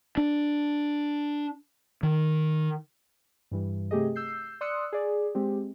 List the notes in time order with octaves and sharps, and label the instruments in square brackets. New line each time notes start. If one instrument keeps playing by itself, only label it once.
[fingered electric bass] D4
D#3
[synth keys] G2 E3 G3
C3 A3 G4 G#4 D#5
E6 G6 C7
D5 C6 D#6 E6 F#6 C#7
G#4 D5
G#3 C4 G4